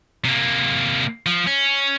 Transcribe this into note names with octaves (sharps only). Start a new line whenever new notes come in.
C3 A#3
F3
C#4